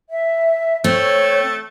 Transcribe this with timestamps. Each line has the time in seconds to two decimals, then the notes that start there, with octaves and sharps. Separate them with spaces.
0.10 E5
0.84 A3 C4 C#5